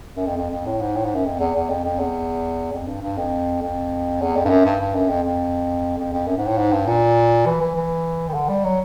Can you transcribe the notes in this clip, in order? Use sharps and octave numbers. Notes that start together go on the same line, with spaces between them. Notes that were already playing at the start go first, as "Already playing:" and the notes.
F#2
F2
F2
F2
A2
G#2
A2
G#2
F#2
F2
E2
E2
F2
F2
E2
F2
G2
G2
F2
F2
E2
F2
G2
F#2
G2
G2
F#2
F2
F2
F2
F2
F#2
G#2
A2
G#2
G2
A#2
E3
E3
E3
D#3
D3
G3
F#3